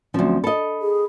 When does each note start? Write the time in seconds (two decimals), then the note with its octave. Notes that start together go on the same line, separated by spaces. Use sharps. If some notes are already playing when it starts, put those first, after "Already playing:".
0.14 D2 F3 F#3 C4 C#4
0.44 A4 D#5 B5
0.82 G#4